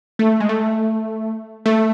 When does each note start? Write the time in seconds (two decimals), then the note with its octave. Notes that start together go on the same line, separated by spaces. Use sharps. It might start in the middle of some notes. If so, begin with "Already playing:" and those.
0.19 A3
0.40 G#3
0.49 A3
1.66 A3